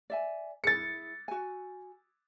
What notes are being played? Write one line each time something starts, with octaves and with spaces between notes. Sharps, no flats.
D5 E5 G#5
E4 G#4 A6 C#7
F#4 G#5